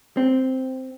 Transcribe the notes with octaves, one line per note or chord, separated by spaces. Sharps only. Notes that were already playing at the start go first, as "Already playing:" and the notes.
C4